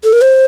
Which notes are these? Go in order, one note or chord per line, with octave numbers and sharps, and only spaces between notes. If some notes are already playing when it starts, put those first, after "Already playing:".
A4
A#4
C5